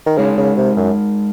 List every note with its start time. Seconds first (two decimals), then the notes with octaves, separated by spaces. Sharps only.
0.06 D#3
0.18 C#3 G#3 D#4 A#4
0.37 C#3
0.57 C3
0.77 F#2